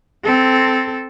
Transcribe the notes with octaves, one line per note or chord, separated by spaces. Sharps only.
C4 A4